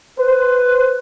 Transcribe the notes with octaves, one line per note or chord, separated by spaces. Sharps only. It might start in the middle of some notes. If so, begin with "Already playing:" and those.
B4 C5